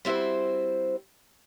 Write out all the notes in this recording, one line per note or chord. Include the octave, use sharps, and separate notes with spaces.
G3 C4 E4 F#4 C5